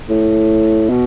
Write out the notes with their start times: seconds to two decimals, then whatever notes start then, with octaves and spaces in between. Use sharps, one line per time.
0.09 A2
0.89 B2